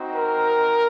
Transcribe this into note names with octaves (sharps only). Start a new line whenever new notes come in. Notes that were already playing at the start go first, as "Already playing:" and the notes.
Already playing: C4 D#4 F#4
A#4